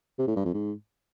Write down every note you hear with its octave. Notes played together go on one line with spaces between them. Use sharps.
C3
A2
G2
F2
G#2